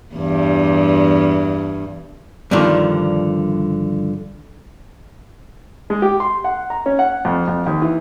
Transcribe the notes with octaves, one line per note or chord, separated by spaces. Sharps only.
E2 G2
G2 B2 D3 D#3 F3
G#3
G4
C6
F#5
A#5
C#4
F#5
F2
F2
D#2
E3